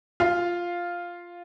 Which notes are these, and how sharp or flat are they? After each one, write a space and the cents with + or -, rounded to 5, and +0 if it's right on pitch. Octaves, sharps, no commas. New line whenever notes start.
F4 +0 F5 +0